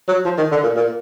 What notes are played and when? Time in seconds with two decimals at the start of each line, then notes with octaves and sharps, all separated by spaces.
0.08 F#3
0.25 F3
0.38 D#3
0.51 D3
0.63 A#2
0.76 A#2